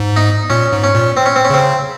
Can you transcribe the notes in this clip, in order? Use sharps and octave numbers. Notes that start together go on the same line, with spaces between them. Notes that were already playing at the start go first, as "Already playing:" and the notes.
Already playing: G#2
D#4
A#2 C#4
G#2
C#4
A#2
C4
C#4
C4
C#4
C#3 C4